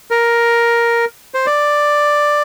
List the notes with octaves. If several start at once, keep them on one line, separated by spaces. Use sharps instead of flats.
A#4
C5
D5